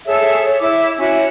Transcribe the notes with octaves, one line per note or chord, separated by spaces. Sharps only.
G#4 A4 C#5 E5
C#5
E4 E5 D6
C#4 E4 F#4 C#5